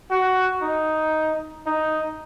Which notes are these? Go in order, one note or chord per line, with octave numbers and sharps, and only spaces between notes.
F#4
D#4
D#4